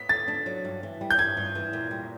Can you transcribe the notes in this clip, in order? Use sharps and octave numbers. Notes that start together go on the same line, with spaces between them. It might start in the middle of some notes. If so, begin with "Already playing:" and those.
Already playing: B3 B6
D3 A6
D4
F#3
G2
E3
G3
G6
G2 G#6
G2
E3
A#2
G3